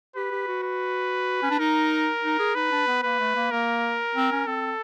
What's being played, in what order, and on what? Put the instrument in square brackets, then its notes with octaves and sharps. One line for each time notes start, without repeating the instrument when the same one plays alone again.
[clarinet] G4 [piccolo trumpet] B4
[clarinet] G4
F#4
[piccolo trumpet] B4
[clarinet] C#4
D4
[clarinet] D#4 [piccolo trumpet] A#4
[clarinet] D#4
G#4
[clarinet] D#4 [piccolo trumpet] B4
[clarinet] D4
B3
[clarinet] A#3 [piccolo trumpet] B4
[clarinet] A3
A#3
[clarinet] A#3 [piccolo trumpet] A#4
[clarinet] C4
C#4
[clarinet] C4 [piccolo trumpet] A4